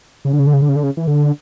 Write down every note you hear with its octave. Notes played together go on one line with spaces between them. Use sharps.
C#3
D3
C#3
D3
C#3
D3
C#3
D3
C#3
E3
D3